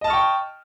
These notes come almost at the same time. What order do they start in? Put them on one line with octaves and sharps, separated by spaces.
D#5 A5 F6 C#6 G5